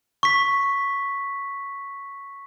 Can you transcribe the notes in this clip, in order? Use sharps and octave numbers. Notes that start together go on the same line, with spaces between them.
C#6 B6